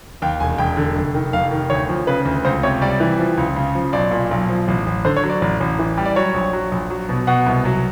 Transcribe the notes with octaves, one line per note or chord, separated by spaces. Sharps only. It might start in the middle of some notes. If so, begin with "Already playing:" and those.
D#2 G5
E1 G#5
E1 G5
D3
F1
D#3
F1 F5
D#3
D2 C#5
F3
C#3 B4
D2
C#2 C5
C3 C#5
G3 D5
E3
F3
C#2
C#3
F3
B1 D5
A#2
B1
F3
A1
A1
D3 C5
C#5
F#3
D5
A1
A1
E3
G3
D5
F#3 C#5
A#1
F#3
A#1
F#3
B2
B2 F#5
C2
F#3